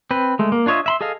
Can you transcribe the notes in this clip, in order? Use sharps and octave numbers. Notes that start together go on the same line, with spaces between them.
C4 B4
G#3 A3
A#3
D4 F4 C#5 D#5 E5
E5 B5 C6
G#4 A4 D#5 F5